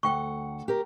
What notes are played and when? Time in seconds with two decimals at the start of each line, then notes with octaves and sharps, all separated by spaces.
0.03 D2 A4 F#5 G5 C#6
0.68 G4 A#4